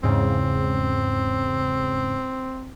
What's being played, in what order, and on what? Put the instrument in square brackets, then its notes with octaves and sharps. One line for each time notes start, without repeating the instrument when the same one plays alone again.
[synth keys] E2 G#2 C#3 [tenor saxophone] C4